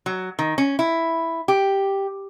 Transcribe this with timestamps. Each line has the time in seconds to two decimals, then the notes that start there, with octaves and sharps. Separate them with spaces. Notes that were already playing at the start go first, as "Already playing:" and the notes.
0.06 F#3
0.39 D#3
0.58 C#4
0.79 E4
1.48 G4